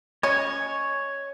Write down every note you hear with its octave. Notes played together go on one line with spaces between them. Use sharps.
C#4 C#5 D#5